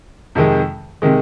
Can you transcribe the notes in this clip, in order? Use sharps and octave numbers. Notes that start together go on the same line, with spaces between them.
F2 C3 D#3 G#3
C3 D#3 G#3